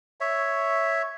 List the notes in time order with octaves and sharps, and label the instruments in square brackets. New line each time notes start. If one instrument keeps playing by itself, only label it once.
[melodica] C#5 E5